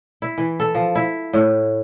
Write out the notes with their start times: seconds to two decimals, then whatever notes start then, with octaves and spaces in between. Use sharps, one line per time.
0.22 E4
0.38 E3
0.60 A4
0.75 F3
0.95 E4
1.33 A2